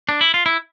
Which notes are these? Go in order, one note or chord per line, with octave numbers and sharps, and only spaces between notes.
D4
E4
F4
E4